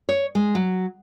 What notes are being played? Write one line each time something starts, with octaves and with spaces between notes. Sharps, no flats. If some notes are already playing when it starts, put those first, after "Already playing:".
C#5
G#3
F#3